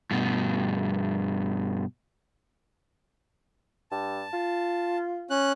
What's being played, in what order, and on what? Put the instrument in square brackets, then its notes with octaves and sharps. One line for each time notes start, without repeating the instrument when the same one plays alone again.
[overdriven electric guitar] G2 B2
[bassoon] G2 [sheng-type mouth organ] A5
[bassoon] F4
[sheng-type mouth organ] C#4 F#6